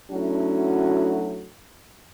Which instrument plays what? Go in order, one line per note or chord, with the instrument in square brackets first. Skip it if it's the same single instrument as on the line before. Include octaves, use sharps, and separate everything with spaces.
[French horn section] F#3 A3 C#4 D4 E4 F#4